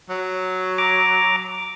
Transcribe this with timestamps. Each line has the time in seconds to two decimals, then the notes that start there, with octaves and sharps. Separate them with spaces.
0.10 F#3
0.78 A#5 D6